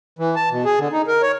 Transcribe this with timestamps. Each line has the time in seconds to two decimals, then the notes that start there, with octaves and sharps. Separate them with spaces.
0.19 E3
0.36 A5
0.51 B2
0.65 G#4
0.79 D3
0.92 D#4
1.08 A#4
1.22 C#5